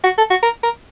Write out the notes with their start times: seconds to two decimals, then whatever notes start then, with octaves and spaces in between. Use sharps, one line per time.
0.04 F#4
0.18 A4
0.30 F#4
0.43 A#4
0.63 A#4